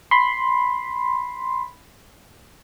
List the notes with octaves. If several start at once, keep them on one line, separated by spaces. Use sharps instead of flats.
B5 C6